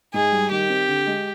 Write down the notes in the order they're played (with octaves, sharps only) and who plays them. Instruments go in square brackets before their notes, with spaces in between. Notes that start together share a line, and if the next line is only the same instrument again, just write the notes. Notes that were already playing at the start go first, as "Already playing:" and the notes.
[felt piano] G#2 [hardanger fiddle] G#4
[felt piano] G3
[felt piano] D#3 [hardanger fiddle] G4
[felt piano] C4
D3
G#3